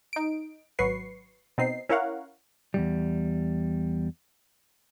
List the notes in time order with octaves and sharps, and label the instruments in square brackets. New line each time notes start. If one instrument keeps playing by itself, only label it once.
[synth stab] D#4 D7
G#1 F#3 B4 C#6 C7
B2 C4 D#4 C7
C#4 E4 A#4 C#5 F5 F#5
[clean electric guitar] E2 G2 G3